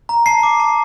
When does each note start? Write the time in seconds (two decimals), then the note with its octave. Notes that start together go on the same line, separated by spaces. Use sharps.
0.09 A#5
0.26 A5 C7
0.43 D6
0.60 A5